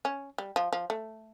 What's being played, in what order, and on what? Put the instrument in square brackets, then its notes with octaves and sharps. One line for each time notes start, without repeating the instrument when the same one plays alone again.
[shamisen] C#4
G3
F3
F3
A3